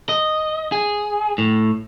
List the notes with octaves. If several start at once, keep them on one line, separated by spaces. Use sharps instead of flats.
D#5
G#4
A2